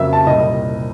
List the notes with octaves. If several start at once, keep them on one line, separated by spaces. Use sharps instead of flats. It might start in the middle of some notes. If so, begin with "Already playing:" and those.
Already playing: F2 C#3 F#3 A#3 E5
A5
C2 A#2 G3 D#5